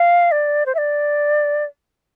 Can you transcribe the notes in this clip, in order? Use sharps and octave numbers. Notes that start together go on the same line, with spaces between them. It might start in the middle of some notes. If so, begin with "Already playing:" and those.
Already playing: F5
D5
C5
E5
D5